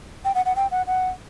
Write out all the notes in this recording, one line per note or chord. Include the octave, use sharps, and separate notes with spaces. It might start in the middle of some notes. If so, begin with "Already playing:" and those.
G5
F#5
F#5
G5
F#5
F#5